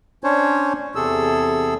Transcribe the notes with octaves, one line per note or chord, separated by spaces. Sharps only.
C#4 D4 C5 C#5
E2 C3 G#4 A4 E6